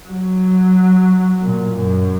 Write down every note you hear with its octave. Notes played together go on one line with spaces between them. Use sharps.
F#3
A#2
F#2